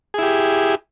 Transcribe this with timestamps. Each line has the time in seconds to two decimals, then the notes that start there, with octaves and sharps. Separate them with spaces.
0.14 G#4
0.18 E4
0.23 G4